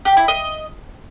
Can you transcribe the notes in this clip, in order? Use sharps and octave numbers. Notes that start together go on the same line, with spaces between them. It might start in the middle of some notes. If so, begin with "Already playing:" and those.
G4
E4
D#5